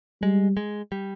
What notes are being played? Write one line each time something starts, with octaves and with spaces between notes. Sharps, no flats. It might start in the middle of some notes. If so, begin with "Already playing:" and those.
G3 G#3
G#3
G3